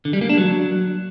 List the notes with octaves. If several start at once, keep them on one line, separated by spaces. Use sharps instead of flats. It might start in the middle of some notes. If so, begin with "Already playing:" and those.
D3
G3
A#3
D4
F#3